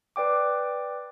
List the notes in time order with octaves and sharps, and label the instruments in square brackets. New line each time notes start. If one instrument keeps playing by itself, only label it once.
[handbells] B4 D5 G5 D6